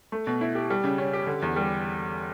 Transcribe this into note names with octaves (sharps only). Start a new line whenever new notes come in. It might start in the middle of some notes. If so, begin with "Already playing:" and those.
A3
B2
E4
G4
G3
C#3
C#4
G4
D3
E2
G3